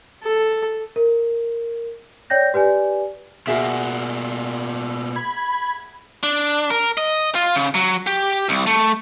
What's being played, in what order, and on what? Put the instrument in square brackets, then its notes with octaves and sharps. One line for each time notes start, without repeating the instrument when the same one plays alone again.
[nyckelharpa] A4
[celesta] A#4
C#5 D5 G5 G6 A#6
G4 B4 D5 G#5
[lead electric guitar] B2 A#3 [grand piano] F#4 G#4 E5
[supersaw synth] B5 G#6
[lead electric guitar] D4
A#4
D#5
F4
C#3
F#3
G4
C2
A3